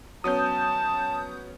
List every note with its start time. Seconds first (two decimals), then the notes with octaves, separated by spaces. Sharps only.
0.24 F#3 B3 C#4 A5 D#6 G6